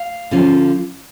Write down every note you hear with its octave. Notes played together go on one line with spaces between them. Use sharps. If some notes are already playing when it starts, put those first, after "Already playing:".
Already playing: F5
D3 F3 C#4 F4